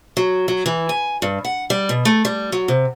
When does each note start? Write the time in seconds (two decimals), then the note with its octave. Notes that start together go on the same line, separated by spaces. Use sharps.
0.17 F#3
0.48 F#3
0.66 E3
0.89 G#5
1.22 G2
1.45 F#5
1.70 G3
1.89 B2
2.05 A3
2.25 G3
2.52 F#3
2.68 C3